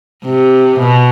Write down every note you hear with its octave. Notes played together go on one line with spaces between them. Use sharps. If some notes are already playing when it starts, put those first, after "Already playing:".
C3
B2